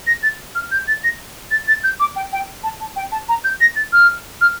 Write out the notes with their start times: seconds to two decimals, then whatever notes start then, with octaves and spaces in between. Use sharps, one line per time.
0.07 A#6
0.23 A6
0.55 F6
0.71 G6
0.88 A6
1.04 A#6
1.51 A6
1.68 A6
1.84 G6
2.00 D6
2.16 G5
2.32 G5
2.63 A5
2.80 A5
2.96 G5
3.12 A5
3.29 A#5
3.44 G6
3.61 A#6
3.76 A6
3.93 F6
4.41 F6